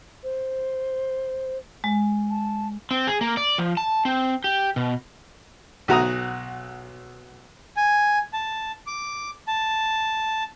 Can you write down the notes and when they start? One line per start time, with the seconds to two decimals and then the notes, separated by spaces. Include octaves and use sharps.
0.23 C5
1.84 G#3
2.30 A5
2.91 C4
3.07 G#4
3.21 A#3
3.37 D5
3.58 F3
3.77 A5
4.05 C4
4.44 G4
4.76 B2
5.88 B1 F#4 A#5 D#6
7.77 G#5
8.33 A5
8.87 D6
9.48 A5